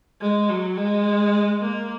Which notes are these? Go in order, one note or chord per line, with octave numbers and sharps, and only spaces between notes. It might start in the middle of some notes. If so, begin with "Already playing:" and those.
G#3
F#3
G#3
A#3